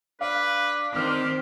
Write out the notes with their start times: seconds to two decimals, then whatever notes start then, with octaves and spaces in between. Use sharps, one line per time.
0.21 D4 B4 F5
0.93 D#3 C4 G4 D6 F6